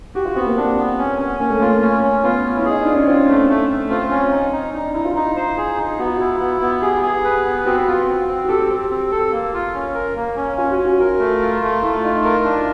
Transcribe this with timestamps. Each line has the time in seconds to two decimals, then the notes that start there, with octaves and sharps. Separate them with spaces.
0.15 F#4 G4
0.25 F4
0.35 B3 C4
0.47 A#3
0.57 D4
0.78 B3
0.98 C#4
1.19 C#4
1.40 A#3 C#4
1.50 A3
1.60 A#3 F4
1.82 C#4
2.03 C#4
2.24 B3 F4
2.44 C#4
2.57 E4
2.65 D#4 G#4
2.82 D4 F4
2.94 C#4
3.07 C4 F4
3.28 A3
3.49 A3
3.69 A3
3.90 C4 F4
4.10 C#4
4.31 D#4
4.52 D#4
4.73 D4 D#4
4.94 D#4 E4
5.05 F4
5.15 D#4
5.36 C5
5.57 G#4
5.78 D#4
5.98 B3 F#4
6.07 F4
6.16 E4 F#4
6.40 B3
6.61 B3
6.82 G4 G#4
7.03 G#4
7.24 B4
7.45 B3
7.65 C4 F#4
7.87 F4
8.08 C4
8.28 C4
8.44 F#4
8.48 G4 A4
8.69 C4
8.90 C4
9.11 A4
9.32 A#3
9.54 F4
9.74 C#4
9.94 A#4
10.16 A#3
10.37 C#4
10.57 C#4 F4
10.71 F#4
10.78 C#4
10.85 F#4
11.00 F4 A#4
11.19 A3
11.41 F4
11.61 A3
11.82 A3 E4
12.03 D#4 F4
12.24 A#4
12.45 D4